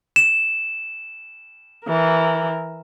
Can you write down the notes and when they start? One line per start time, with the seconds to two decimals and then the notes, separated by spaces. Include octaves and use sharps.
0.16 E7
1.86 E3 A#4